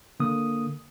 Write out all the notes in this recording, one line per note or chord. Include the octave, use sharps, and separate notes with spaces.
D3 A#3 D#6